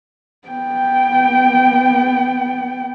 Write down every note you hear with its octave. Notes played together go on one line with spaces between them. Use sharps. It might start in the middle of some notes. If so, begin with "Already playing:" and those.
B3 G5